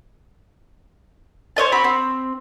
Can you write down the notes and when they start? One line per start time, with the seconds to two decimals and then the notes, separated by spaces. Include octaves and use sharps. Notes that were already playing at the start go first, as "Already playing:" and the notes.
1.57 C5 C#5 D#5 A5
1.72 C4 F#4 B5
1.84 C4